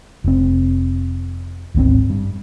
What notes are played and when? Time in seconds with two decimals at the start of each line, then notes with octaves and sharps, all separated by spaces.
0.24 F1 C4
1.74 D1 G#1 B3 C4
2.10 G2